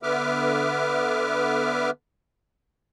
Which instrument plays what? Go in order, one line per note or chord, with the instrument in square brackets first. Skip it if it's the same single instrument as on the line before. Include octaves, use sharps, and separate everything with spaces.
[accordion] D3 B3 B4 E5 D6 F6